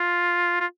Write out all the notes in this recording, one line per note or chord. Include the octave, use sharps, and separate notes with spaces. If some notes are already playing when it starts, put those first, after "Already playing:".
Already playing: F4
F4